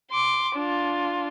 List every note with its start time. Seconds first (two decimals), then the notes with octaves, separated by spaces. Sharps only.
0.11 C6 D6
0.55 D4 F4